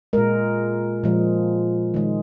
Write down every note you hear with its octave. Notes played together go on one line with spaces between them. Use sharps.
A#2 G#3 A#4
A#2 F3 G#3
D#3 G#3